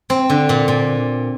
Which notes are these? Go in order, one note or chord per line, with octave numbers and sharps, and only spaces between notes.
C4
D3
A#2
A#2